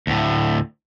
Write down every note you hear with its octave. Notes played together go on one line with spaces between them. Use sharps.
D2 A2